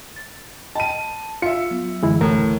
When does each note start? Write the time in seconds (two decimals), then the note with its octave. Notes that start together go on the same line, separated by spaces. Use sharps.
0.16 A6
0.75 D#5 G5 A5 B5 D#7
1.42 F4 E5 C#7
1.71 F#3 B3
2.03 F#2 D3 E3 G#3 E4
2.21 C#2 A2 A#4